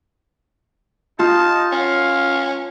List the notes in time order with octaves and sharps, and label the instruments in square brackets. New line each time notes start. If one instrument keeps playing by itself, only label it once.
[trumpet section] D#4 [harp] F4 [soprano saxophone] A5
[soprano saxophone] C#4 [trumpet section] F5